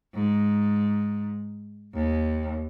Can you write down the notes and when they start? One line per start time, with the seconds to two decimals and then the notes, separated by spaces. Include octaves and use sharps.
0.15 G#2
1.94 D#2